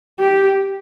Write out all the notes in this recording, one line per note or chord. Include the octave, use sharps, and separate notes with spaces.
G4